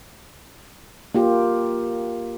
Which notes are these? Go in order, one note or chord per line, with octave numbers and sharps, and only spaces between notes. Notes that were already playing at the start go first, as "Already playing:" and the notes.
A#3 F4 G4